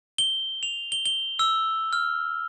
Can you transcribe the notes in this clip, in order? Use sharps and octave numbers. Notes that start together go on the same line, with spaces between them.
G7
F7
G7
G7
E6
F6